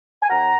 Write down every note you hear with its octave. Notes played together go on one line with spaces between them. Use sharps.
G#5
D#2 F#5 A#5